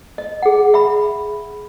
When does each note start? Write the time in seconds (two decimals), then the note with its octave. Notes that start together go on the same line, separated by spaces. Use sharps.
0.18 D#5
0.42 G#4 F#5
0.74 E5 B5